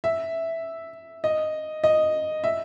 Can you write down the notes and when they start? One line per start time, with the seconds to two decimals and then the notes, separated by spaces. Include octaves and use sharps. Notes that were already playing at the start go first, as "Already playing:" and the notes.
0.04 E5
1.24 D#5
1.84 D#5
2.44 E5